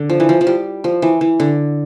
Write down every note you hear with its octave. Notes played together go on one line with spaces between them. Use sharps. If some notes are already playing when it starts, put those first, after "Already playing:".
Already playing: D3
F3
E3
F3
F3
G3
F3
E3
E3
D3